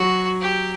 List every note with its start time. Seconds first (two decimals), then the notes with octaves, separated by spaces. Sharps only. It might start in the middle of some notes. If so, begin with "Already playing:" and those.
Already playing: F#3 F#4
0.41 G4